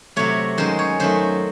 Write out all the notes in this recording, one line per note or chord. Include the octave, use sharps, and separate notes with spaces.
C3 F#3 A3 C#5
F#2 D#3 G#3 C5
C#5
F#2 D#3 F#3 A3 C5